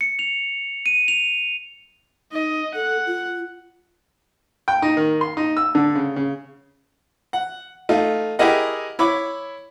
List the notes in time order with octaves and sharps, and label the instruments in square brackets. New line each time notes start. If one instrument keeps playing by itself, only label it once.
[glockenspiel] C#7
F7
D#7
F7
[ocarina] D#4 [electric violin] D#5
[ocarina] A4 [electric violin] F#5
[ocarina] F4
[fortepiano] G5
D#4
D#3
C6
D#4
E6
D3
C#3
C#3
F#5
A3 D#4 F4
E4 G4 G#4 A#4 D#5 F#5
E4 C#5 B5 D6